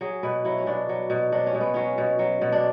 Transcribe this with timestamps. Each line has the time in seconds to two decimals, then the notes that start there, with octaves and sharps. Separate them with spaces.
0.01 F#3 G#4
0.23 B2 B4
0.45 F#3 E4
0.58 C#4
0.66 B2 D4
0.89 F#3
1.10 B2
1.32 F#3 D4
1.47 C#4
1.55 B2
1.61 B3
1.74 F#3 C#4
1.98 B2
2.19 F#3
2.41 B2
2.52 D4